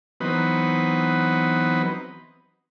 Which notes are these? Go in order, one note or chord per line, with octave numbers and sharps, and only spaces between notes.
E3 F#3 B3 C4 D#4 B4